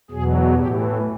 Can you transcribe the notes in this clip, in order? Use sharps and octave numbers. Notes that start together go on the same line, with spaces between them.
E2 B2 F#3 G#4
A2 E3 G4